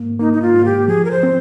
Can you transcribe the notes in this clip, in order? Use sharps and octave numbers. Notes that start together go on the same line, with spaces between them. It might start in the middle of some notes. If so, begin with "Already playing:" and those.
Already playing: G#2 A#3
A#3 D#4
D#4
F4
G#2
G4
F3 G#4
A#4
C5
C4